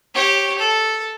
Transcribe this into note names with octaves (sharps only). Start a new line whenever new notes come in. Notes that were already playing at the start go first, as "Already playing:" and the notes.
G4 C#5
A4